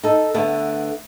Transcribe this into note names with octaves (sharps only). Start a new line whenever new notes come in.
D#4 A4
D3 A3 B3